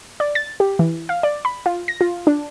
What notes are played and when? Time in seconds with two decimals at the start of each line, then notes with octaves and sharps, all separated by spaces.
0.20 D5
0.35 A6
0.60 G4
0.79 E3
1.09 F5
1.23 D5
1.45 B5
1.66 F4
1.88 A#6
2.01 F4
2.27 D4